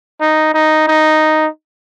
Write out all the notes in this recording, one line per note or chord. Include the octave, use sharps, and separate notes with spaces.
D#4
D#4
D#4